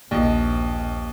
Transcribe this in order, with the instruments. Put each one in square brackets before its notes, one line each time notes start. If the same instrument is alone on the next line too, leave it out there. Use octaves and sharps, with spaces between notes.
[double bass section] A#1 [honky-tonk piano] D#2 D#5